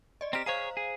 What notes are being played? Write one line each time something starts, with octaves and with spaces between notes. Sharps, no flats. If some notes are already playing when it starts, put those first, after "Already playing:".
D5 D#5
C4 G4 A#5 F6
G#4 C5 C#5 F5 A#5
G#4